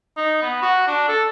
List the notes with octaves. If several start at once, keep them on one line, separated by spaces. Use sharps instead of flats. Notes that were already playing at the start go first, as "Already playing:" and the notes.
D#4
B3
F#4
D4
A4